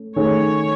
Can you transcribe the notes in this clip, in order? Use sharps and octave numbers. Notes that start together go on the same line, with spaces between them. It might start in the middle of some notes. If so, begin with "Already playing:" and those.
Already playing: A3 C#4
D#3 A3 C#4 G#4 C#5